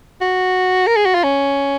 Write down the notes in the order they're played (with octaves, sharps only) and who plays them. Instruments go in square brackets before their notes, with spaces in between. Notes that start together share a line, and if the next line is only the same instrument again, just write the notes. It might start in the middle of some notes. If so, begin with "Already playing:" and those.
[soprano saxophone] F#4
A#4
G#4
F#4
F4
C#4